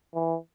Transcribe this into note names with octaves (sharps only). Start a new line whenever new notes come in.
E3